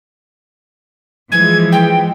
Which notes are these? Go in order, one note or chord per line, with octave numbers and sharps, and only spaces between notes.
E3 F3 G#3 G#6
G5